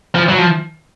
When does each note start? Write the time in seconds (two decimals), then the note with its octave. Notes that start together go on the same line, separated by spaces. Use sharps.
0.15 F3
0.29 F#3
0.38 F3